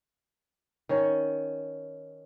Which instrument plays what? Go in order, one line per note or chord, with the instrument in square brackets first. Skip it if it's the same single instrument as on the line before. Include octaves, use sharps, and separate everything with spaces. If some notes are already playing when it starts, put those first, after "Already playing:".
[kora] D#3 C#4 C#5